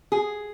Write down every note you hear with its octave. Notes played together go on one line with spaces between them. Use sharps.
G#4